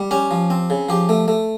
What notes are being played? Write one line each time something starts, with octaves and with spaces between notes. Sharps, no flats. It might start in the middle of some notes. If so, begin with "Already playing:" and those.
Already playing: G3
C#4 G4
F3
C4
C#3
F3 G4
A3
A3